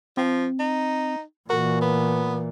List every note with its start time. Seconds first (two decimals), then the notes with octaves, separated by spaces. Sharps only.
0.17 F3 C4
0.59 D#4
1.50 A#2 E3 F#4 A#4
1.81 B3